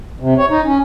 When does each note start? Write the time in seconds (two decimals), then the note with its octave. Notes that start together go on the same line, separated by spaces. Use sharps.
0.20 C3
0.38 C#5
0.50 D#4
0.65 C#4